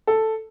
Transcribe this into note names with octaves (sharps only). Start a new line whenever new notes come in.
A4